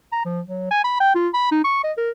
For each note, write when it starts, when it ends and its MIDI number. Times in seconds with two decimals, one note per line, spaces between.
0.13 0.25 82
0.26 0.40 53
0.48 0.67 54
0.71 0.84 80
0.84 0.99 83
1.00 1.14 79
1.15 1.29 65
1.34 1.52 83
1.52 1.61 63
1.64 1.81 85
1.84 1.92 75
1.97 2.11 70